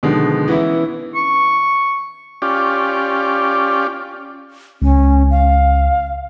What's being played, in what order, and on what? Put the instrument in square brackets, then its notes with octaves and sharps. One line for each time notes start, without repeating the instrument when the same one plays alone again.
[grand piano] B2 D3 D#3 F3 G#3
E3 B3 C#4 E4
[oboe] C#6
[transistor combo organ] C#4 F4 G4 D5
[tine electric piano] C#2 [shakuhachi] C#4
[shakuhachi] F5